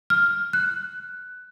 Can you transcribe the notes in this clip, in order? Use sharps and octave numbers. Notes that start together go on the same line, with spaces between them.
F6
F#6